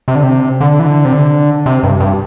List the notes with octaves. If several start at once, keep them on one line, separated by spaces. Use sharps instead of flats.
C3
D3
C3
D3
E3
D3
C3
D3
C3
G2
G2